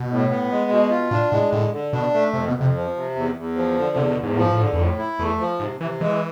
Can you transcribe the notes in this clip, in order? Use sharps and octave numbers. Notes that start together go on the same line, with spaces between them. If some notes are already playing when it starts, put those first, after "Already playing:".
Already playing: B2
A2
B3
G#3
B2
F4
A2 D4
A2 G#3
A2 D3
D3
B2 D4
A3
F2 C3
B2
F2
C3
F3
C3
E2
E2
F3
D3
E2 C3
B2
E2
G#2
A2 F3
G#2
A2
D3
G#2
E2
F2 A2
E4
E2 A3
F3
G#2 C3
C3 E3
E3 G#3